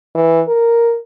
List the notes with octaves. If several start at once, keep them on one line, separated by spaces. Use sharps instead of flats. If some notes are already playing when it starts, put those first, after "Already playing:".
E3
A#4